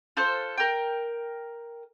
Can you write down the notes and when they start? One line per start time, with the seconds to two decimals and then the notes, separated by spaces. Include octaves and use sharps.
0.17 F4 A4 C5 F#6
0.57 A#4 G5